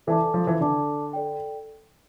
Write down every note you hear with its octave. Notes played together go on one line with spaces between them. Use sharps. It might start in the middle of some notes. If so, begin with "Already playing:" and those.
E3 A4 D5 A5 D6
F3
E3
D3 A4 D5 A5 D6
A4 D5 G5